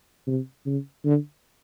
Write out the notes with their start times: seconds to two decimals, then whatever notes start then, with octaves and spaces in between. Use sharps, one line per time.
0.27 C3
0.66 C#3
1.05 D3